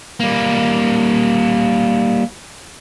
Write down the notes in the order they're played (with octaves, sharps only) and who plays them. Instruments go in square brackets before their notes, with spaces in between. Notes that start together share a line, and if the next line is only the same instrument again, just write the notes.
[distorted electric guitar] G3 A#3